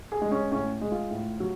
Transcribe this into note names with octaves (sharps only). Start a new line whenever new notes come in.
G#4
G#3
C#4
A2 C#4
G#3
F4
A2
F#3